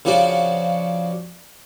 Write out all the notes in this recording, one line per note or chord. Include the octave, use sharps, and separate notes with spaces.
C#3 F3 D4 F#4